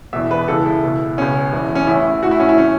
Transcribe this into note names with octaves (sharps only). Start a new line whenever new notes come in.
E1 E2 B2 E5
B4
C#2 C#3 E3 A4
E4
C#2 B2
C#2 B2 C#4
E1 E2 E3
C#4
A1 A2 E3 E4
A1 A2 E3 F#4
E4
C#4
E4
A2 E3 C#4